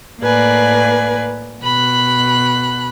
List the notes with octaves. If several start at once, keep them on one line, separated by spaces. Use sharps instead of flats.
A2 A#3 B4 D5 G#5
B2 B5 F#6